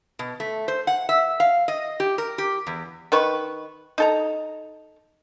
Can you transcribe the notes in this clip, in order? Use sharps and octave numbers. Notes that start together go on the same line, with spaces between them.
B2
A3
C5
F#5
E5
F5
D#5
G4
A#4
G4
E2
D#3 B4 C#6
D#4 A4 A#5